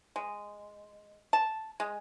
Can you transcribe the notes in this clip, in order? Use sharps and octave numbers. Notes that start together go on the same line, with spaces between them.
G#3
A5
G#3